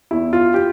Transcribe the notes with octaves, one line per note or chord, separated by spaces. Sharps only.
E2 E4
F4
G4